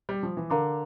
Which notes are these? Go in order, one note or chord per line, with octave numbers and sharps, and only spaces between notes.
G3
F3
E3
D3 A#4 F5 A#5 D6